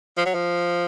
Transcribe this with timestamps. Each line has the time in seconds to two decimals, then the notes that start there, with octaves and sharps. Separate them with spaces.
0.17 F3
0.26 F#3
0.34 F3